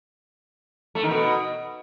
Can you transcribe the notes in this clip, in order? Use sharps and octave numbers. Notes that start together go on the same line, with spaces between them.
A3
D#3
B2